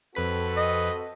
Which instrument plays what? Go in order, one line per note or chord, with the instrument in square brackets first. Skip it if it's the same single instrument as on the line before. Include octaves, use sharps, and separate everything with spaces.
[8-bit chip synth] F2 B4 B6 [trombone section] C4 F#4 A4
[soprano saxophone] D#5